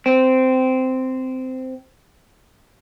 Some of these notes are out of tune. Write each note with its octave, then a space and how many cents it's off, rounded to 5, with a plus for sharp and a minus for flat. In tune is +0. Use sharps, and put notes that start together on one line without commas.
C4 -15